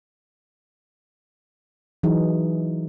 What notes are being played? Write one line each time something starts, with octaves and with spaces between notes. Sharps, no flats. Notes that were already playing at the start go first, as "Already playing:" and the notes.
E3 F#3 D#4 G#4